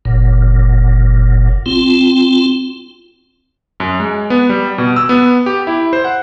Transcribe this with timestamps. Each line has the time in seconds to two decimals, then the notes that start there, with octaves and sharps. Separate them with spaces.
0.05 F#1 A#2
1.66 C4 F4
3.80 F#2
4.00 G#3
4.30 B3
4.49 G3
4.78 B2
4.96 E6
5.09 B3
5.46 G4
5.67 E4
5.93 C5
6.04 F#5